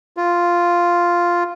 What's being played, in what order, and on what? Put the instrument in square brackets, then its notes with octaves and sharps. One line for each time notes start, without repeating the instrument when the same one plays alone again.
[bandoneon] F4